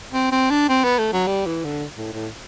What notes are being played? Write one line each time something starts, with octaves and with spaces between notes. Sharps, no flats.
C4
C4
D4
C4
B3
A3
F#3
G3
E3
D3
A2
A2